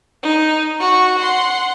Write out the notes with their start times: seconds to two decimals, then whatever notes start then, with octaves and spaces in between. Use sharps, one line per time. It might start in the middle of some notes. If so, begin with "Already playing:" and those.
0.23 D#4
0.79 F#4 C#6
1.19 F#5 C6